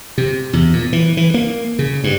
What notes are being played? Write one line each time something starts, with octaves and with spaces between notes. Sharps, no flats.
C3
E2
A#2
E3
E3
A#3
C#3
G2